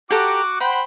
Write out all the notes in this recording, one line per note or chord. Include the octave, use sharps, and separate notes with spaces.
F#4 G4 A4 F#5 A#5 D6
C5 F#5 G5 B5